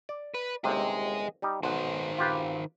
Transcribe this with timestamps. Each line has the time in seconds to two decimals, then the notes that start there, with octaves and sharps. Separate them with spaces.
0.09 D5
0.34 B4
0.64 G1 D#2 C3 G#4 D#5
1.42 G3 D#4 G4
1.63 B1 D#3 C5 F#5
2.18 F4 G4 B4